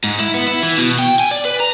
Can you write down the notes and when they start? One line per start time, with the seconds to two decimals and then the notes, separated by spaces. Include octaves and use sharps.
0.04 G#2
0.20 E4
0.34 B3
0.48 E4
0.63 E3
0.78 B2
0.99 G5
1.19 G#5
1.31 D5
1.45 B4
1.60 A#5